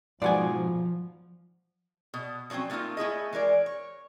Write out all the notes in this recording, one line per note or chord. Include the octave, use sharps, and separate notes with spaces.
G#2 B2 F3 F4 D5 F#5 G#5
B2
F3 F#3 A3 C4 C#4
D3 A3 A#3 D#4 F4
A3 E4 G#4 D#5
E3 G#3 A#4 D5
C#5